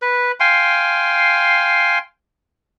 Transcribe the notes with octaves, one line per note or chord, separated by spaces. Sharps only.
B4
F5 G5 G#5 C6